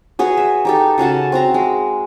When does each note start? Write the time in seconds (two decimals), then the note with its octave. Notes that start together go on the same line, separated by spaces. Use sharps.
0.19 F#4 G#4 B4 C#5
0.37 E5
0.65 D#4 G4 A4
0.98 C#3 C#4 F#4 A5
1.32 C4 F#4 A#5
1.54 G#3